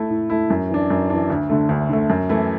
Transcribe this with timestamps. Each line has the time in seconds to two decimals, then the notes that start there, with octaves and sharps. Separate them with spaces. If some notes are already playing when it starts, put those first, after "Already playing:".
Already playing: A3 E4
0.10 A2
0.30 A3 E4
0.50 F#2
0.70 E3 D4
0.90 F#2
1.10 E3 D4
1.30 D2
1.50 D3 A3
1.69 D2
1.89 D3 A3
2.10 F#2
2.29 E3 A3 E4